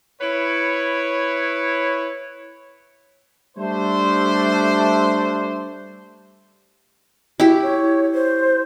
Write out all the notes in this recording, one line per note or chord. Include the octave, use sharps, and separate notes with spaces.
E4 B4 C#5
G3 A3 D4 C5
E4 F#4 G4
C#5
C5